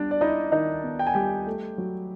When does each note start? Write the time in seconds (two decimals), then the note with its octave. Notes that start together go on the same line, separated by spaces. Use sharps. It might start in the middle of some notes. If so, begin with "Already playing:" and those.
Already playing: G3 B3 D4 D5
0.11 D5
0.21 D#4 E4 D#5
0.52 D#3 D#4 D#5
0.84 B3
0.99 G5
1.07 G#5
1.14 G3 G4 G5
1.47 A3
1.78 F#3